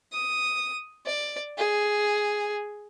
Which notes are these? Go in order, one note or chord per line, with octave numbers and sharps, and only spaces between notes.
D#6
D5
G#4